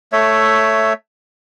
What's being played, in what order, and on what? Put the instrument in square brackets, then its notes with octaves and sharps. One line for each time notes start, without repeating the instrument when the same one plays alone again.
[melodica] A3 C#5 E5